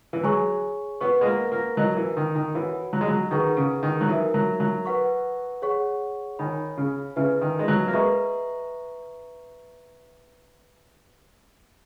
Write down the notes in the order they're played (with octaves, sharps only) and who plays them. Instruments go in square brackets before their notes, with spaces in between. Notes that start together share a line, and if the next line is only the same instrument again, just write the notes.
[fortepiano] E3
[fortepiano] F#3 [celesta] G#4 C#5 G#5 C#6
[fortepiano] B3 [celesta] B4 F#5 C#6
[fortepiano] G#3
A#3
A#3
[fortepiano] F#3 [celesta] E4 A#4 D#5
[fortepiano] E3
D#3
D#3
[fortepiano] E3 [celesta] F#4 C#5 F#5 B5
[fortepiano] F#3
G#3
F#3
[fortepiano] D#3 [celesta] G#4 B4 F#5 A#5 C#6
[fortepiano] C#3
D#3
F#3
[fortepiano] E3 [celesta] D#4 A#4 E5
[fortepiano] F#3
F#3
[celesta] B4 F#5 C#6
G#4 C#5 F#5 C#6
[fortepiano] D#3 [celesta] C#5 G#5 B5
[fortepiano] C#3
[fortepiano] C#3 [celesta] E4 B4 E5 G#5
[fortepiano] D#3
G#3
F#3
A#3
[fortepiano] G#3 [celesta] B4 E5 A#5 C#6